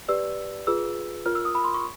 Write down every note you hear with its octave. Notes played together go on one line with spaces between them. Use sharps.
G4 B4 D5 E6
F4 G#4 B4 E6
F4 A#4 C#5 F6
E6
D#6
B5
C6
C#6